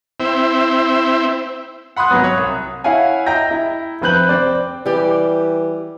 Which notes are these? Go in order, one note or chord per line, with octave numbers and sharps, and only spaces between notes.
C4 E4
F#5 B5 C6 D#6 F#6
G#1 C3 F#3 B3 D#6
C#5
C2
E4 C#5 F5 F#5 G#5
D#5 E5 G5 A#5 G6 A#6
E4
F1 C4 B4 F#6 G6 F#7
C4 D5
E3 G3 G4